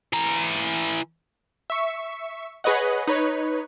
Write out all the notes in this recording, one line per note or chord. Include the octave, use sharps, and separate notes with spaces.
E3 A#5
E5 C#6
G#4 B4 C#5 D#5 F#5
D#4 B4 C#5